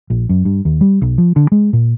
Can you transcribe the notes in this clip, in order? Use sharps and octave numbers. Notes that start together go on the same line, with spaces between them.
A#1
F#2
G2
D#2
G3
B1
F3
D3
G#3
A#2